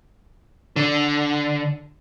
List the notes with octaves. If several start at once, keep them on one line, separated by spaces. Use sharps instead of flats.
D3